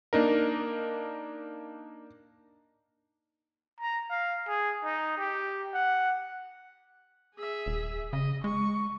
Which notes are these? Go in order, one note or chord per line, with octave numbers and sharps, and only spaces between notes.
A#3 D4 D#4 A#4
A#5
F5
G#4
D#4
G4
F#5
G#4 E5
D#1
C#3 D#5
G#3 C#6